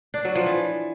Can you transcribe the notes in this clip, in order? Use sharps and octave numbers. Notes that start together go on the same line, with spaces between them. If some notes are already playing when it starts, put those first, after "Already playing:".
D4
F#3
F3
E3